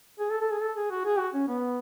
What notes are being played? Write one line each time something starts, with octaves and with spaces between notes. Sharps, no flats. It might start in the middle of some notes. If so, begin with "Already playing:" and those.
G#4
A4
A4
G#4
A4
G#4
F#4
G#4
F#4
C#4
B3